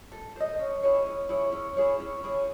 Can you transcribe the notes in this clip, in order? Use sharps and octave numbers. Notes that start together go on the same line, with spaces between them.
A4
C5 D#5
C#4
E4 G#4 C#5
C#4
E4 G#4 C#5
C#4
E4 G#4 C#5
C#4
E4 G#4 C#5